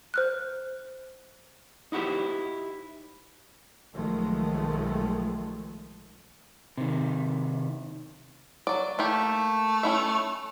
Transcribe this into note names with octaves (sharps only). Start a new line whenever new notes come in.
C5 F6 F#6
D#4 E4 F#4 G4 C5
B1 D#3 F3 G#3 A3
C3 D#3
F#3 D5
A3 A#3 E4 G4
C#4 E4 E5